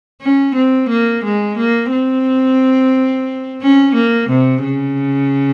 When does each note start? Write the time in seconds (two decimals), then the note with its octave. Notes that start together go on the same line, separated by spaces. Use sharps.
0.22 C#4
0.55 C4
0.89 A#3
1.24 G#3
1.58 A#3
1.92 C4
3.62 C#4
3.95 A#3
4.30 C3
4.64 C#3